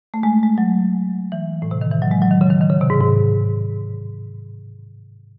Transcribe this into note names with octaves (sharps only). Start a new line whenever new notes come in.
A3
G#3
G#3
F#3
E3
A2
C3
D#3
E3
F#3
G#3
F#3
D#3
C#3
D#3
D#3
C#3
C3
G#2
G#2